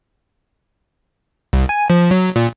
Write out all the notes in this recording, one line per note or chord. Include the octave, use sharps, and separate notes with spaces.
C2
G#5
F3
F#3
A#2